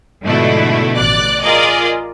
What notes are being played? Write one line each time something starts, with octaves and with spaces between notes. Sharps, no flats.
G#2 B2 D3 F3 A3 E4
A1 D5 F#6
F4 G#4 A#4 D5 D#5